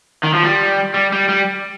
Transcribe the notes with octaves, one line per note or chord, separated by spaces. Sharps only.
D#3
F3
G3
G3
G3
G3